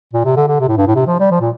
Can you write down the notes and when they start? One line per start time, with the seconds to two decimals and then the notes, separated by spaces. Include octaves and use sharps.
0.13 A#2
0.25 C3
0.37 D3
0.48 D3
0.60 C3
0.69 A2
0.77 G2
0.87 A2
0.95 C3
1.07 F3
1.20 G3
1.31 F3
1.41 A#2